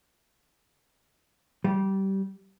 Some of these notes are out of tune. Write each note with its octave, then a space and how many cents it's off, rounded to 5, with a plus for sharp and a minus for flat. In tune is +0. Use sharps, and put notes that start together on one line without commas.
G3 -20